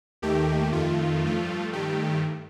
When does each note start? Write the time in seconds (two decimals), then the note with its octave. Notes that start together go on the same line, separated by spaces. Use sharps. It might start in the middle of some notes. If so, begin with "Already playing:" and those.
0.22 D#2 D#3 A3 G4
0.72 F2 D#3 A3 F4
1.23 G2 F3 A3
1.73 G2 D#3 A3 G4